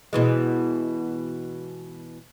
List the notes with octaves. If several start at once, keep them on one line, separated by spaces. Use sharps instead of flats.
B2 E3 G#3